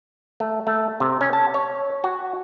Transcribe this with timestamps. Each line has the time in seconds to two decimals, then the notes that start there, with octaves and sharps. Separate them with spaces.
0.40 A3
0.67 A3
1.00 C3
1.21 C#4
1.33 A5
1.54 C#5
2.04 F#4